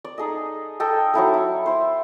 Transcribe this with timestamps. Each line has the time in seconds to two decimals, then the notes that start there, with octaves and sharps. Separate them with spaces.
0.04 D5
0.18 D#4 G#4 A4 D#5
0.80 A4 D#5 G5
1.14 F#3 D#4 E4 A4
1.34 E4
1.66 E4 C5